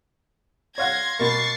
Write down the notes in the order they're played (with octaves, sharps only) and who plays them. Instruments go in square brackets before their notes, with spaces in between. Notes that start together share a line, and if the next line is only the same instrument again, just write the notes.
[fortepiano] C#5 F5 F#5 [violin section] C6 G#6 A#6
[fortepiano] B2 A#3 [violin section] C#6 A6 C7